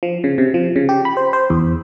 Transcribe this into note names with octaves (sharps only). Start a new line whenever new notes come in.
F3
C#3
C3
F3
C#3
G4
B5
C5
C5
E2